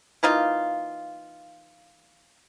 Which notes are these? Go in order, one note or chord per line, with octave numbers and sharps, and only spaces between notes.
E3 A#3 D#4 F4